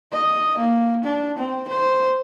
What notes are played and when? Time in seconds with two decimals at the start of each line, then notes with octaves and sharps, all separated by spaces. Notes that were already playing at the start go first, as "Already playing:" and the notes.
0.12 D#5
0.58 A#3
1.04 D4
1.38 C4
1.68 C5